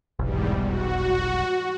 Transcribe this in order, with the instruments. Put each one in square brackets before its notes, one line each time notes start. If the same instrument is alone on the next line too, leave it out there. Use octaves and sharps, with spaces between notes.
[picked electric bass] F1 B1 [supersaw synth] E2 G#2 G3
[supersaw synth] F#4